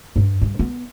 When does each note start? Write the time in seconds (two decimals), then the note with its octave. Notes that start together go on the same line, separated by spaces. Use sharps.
0.16 G2
0.41 G2
0.59 B3